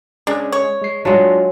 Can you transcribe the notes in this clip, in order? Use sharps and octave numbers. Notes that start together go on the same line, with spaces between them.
G#3 C#4 D4 G#4
C#5
G#3 C7
F#3 G#3 D4 F4 D#5